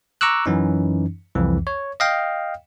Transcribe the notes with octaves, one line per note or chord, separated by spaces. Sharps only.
A#5 C#6 D6 E6 F#6
F#2 E3 C#4 D#4
C2 F2 E3
C#5
D#5 F5 G5